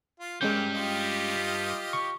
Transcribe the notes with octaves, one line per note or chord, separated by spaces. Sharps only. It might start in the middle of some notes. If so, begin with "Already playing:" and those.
F4
G2 G3 G#3 A#3 C#4 G6
F4 G4 D#5
C#6